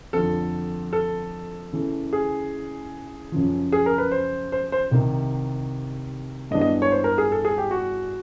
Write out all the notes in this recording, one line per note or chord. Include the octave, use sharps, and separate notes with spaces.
F2 D3 F3 A4
A4
C#3 E3 A3
G#4
F#2 C#3 F3
G#4
A#4
B4
C5
C5
C5
C2 C3 D#3
G2 E3 G#3 B3 D4 D#5
D#5
C#5
C5
A#4
G#4
A4
G#4
G4
F#4